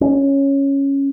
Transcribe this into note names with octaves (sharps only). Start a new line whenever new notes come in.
C#4